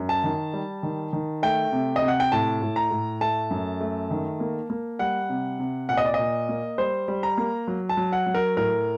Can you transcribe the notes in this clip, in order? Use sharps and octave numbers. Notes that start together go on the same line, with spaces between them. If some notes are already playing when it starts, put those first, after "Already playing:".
Already playing: F#2
A5
D#3
G3
D#3
D#3
A3 G5
C3
D#5
C3
F#5
G5
A2 A5
A2
A#5
A2
A3 A5
F#2
A3
D#3
A#3
A#3
G3 F#5
C3
C3
A#2 F#5
D#5
D5
D#5
A#2
A#3
G3 C5
G3
A#5
A#3
F#3
A5
F#3
F#5
F#3
A#4
A2 A#4